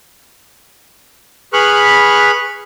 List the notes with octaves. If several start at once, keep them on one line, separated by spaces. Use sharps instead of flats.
G#4 B4 B5 C#6 F6 F#6